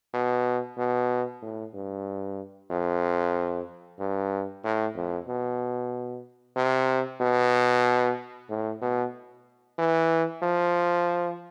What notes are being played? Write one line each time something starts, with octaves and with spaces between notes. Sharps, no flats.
B2
B2
A2
G2
F2
G2
A2
F2
B2
C3
B2
A2
B2
E3
F3